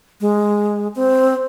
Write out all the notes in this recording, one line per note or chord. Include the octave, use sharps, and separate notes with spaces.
G#3
C4